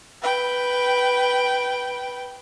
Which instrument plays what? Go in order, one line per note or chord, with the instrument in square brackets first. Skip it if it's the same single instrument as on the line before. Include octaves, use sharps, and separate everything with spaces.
[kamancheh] B4 G5